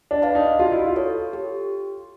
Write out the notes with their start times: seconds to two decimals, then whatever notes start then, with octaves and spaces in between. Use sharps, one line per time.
0.11 D4
0.22 B4 D5 F5 A5
0.35 D#4
0.59 F4 F#4
0.72 E4
0.86 F4
0.96 A4 C#5
1.33 G4